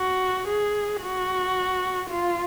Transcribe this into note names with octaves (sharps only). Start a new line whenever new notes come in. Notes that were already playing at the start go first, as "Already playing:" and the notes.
Already playing: F#4
G#4
F#4
F4